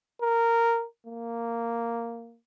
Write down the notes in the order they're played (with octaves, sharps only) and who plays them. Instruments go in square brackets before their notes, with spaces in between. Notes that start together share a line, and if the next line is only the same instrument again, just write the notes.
[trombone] A#4
A#3